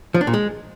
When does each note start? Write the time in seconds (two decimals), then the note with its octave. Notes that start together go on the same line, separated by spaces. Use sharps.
0.14 F3
0.21 D4
0.27 A#2
0.34 G#3